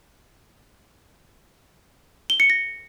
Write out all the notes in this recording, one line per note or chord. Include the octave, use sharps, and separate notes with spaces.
G7
C#7
A#6